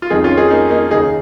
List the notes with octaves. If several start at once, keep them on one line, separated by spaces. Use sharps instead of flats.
F4
F2 D#3 D#4 G#4
C#4 F4
D#4 G#4
A#3 D#4
A#3 D#4
D#2 C#3 D#4 G#4